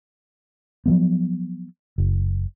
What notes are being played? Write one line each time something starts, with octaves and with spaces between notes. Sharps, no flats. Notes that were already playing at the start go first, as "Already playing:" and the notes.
F3 F#3 B3
F#1